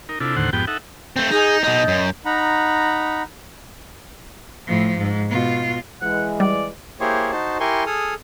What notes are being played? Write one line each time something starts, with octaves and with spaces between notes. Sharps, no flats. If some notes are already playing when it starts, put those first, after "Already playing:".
D#4 A#4
C3 D4 E4 F4 A4
D#2 A2 D3 C5 F#5
F2 G#2 B3 G4 G5
D#4 A4 E5 F#5
A3 C4 G6
D#4 G#4
B2 D#4 D#5
F#2
D#4 F#5 A#5 B5
A2 F3
G#2
B2 F4
E3 G#3 F#5
G3 D5
A#3 E4 G4 G#4 C5 C#5
D#4 F#4 C5 A5
E4 G4 A#4 G#5 C6 C#6
G#4 A4 D#6 F6